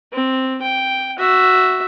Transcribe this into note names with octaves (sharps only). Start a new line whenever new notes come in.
C4
G5
F#4 E5